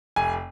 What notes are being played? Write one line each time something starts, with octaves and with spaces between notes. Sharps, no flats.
F1 G#5